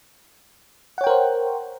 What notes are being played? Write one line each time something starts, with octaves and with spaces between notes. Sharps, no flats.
A#4 C5 C#5 F#5 G5